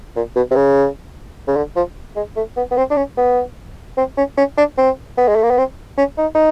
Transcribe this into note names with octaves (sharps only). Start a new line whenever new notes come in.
A#2
B2
C3
C#3
C#3
D3
F3
G#3
A3
B3
B3
C4
D4
C#4
B3
C4
C#4
C#4
D4
C4
B3
G#3
A3
A#3
B3
C4
C#4
D#4
D#4